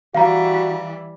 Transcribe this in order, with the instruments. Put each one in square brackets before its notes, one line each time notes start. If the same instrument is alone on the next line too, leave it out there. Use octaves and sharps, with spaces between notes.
[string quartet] E3 G3 [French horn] F#4 [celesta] F5 A#5